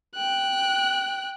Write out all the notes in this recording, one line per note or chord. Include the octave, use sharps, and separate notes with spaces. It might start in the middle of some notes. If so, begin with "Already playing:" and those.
G5 F#6